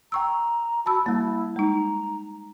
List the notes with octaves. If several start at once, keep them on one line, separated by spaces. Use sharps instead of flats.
G5 A#5 C#6 E6
F#4 A5 B5 E6
G3 A#3 E4
G#3 D#4 A#5